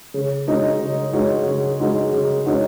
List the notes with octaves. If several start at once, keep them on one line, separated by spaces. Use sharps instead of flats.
C#3
G#3 D#4 F#4 C#5
C#3
G#3 D#4 F#4 C#5
C#3
G#3 D#4 F#4 C#5
C#3
G#3 D#4 F#4 C#5